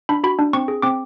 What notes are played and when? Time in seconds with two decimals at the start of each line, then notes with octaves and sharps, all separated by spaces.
0.09 D4 B5
0.24 F#4 B5
0.39 D4
0.53 C4 C#6
0.68 G#4
0.82 C4 D6